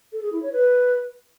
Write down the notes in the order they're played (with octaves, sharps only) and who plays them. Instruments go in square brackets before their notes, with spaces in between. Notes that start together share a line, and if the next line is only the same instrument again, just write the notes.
[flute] A4
G#4
E4
C#5
B4